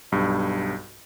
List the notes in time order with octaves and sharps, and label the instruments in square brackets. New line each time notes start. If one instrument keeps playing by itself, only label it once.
[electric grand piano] B1 G2